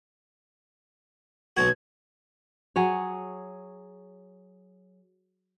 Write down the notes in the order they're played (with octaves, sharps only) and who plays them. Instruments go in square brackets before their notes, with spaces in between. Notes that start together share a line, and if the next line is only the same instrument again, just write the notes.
[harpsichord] B1 F#4 [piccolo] G#6
[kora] F#3 G#4 C#5